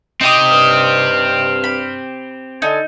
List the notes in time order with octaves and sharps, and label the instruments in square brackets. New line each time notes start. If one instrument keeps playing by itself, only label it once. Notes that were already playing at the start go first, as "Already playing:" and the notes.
[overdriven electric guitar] C4 G4 [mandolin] D#4 D#5 D#6
[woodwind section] G2 F6
[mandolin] B5
[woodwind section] D3 A4 G#5 [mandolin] D#4